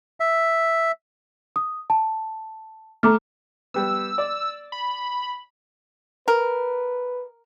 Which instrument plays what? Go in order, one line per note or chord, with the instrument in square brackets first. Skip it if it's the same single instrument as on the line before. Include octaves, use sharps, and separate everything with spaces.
[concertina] E5
[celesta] D#6
A5
[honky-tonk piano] A3 [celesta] A#5 D6 F6
[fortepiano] G3 B3 [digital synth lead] E6
[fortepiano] D5
[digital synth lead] B5
[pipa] A#4 [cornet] B4